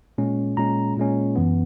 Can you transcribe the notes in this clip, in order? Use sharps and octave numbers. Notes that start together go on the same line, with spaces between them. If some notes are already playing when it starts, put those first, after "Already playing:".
A#2 G#3 C#4
A#2 G#3 C#4 A#5
A#2 G#3 C#4
F#2 E3 B3